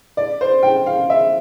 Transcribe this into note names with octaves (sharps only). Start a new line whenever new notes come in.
D5
C5
G5
F5
E5